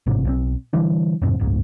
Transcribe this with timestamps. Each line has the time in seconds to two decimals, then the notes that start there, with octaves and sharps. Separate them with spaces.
0.07 A1 G#2 C3
0.25 B1 D#3 C4
0.73 D3 E3 G3 D4
1.22 F2 G#2 C3
1.40 F#1 C#2 G#2